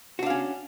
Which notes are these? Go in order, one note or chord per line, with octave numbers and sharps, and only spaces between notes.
C#4 D4 F#4 F5